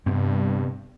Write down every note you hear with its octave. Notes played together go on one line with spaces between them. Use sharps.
G2 C3 B3 C4